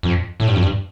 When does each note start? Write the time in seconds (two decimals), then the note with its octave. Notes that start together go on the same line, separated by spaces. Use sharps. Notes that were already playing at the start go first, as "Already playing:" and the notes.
0.03 F2
0.40 A2
0.47 G2
0.55 F2
0.63 G2